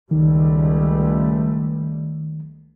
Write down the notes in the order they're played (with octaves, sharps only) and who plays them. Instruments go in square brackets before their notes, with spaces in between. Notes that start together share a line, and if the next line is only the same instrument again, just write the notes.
[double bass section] C#2 G3 A3 [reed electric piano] D#3